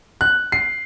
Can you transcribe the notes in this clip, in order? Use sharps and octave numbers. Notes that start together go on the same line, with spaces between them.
F#6
C7